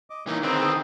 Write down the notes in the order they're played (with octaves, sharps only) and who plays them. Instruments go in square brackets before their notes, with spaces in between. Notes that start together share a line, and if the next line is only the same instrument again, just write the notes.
[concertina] D#5 D6
[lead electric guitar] E3 A#3 [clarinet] D#4 [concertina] C#5
[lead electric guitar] D3 D#3 [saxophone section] C4 [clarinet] G#4 [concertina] B4 D#5 A#5
[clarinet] D#6